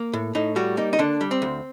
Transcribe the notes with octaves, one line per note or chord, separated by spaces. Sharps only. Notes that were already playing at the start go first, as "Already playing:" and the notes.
Already playing: A#3
A2
A2 D#4
G3 F#4
A#3 D#4
D#4
D3 D4
G3
C4
D2